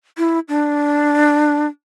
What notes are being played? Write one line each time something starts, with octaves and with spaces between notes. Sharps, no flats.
E4
D4